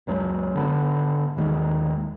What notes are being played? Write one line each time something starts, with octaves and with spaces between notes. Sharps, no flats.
C#2 F#2 F#3 G#3
G#1 D3 B3
D1 D#2 D#3 G#3